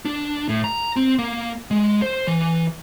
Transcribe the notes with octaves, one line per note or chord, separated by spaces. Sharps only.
D4
A2
A#5
C4
A#3
G#3
C5
E3